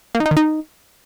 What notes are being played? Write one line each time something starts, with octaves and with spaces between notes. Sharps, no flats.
A#3
D#3
D#4
D#3
D#4